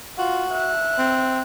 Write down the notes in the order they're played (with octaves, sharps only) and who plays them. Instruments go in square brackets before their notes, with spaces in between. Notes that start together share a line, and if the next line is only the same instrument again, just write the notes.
[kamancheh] F4 [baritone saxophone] F#4
[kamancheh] E5 F#6
[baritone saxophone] C4